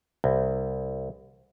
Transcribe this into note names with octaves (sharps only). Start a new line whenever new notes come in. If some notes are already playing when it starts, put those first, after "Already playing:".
C2